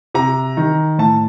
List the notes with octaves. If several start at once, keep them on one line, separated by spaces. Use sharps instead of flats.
C3 A#5
D#3
A2 A5